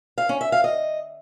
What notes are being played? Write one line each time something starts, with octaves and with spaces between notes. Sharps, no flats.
F5
C#4
E5
F5
D#5